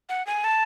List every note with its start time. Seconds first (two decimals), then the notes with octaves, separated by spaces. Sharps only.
0.09 F#5
0.27 G#5
0.44 A5